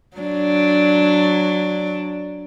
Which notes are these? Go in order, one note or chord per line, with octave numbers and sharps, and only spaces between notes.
F#3 D4